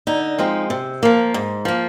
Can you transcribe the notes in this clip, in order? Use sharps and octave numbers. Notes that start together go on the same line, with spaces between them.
D3 D#4
F3 G#3 C4
C3
F3 A#3
G#2
F3 A#3